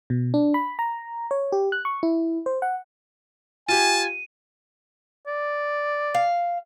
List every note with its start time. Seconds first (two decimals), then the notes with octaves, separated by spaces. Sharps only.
0.10 B2
0.34 D4
0.54 B5
0.79 A#5
1.31 C#5
1.52 G4
1.72 F#6
1.85 C#6
2.03 E4
2.46 C5
2.62 F#5
3.69 F4 G4 G#5 A5 D#7
5.27 D5
6.14 F5